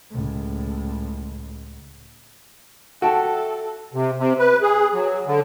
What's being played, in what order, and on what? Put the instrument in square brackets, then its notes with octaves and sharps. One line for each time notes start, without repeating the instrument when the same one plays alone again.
[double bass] C#2 A2
[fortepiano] F#4 [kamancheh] A4 [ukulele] E5 G5 A5
[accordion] C3
C3
B4
G#4
F#3
D3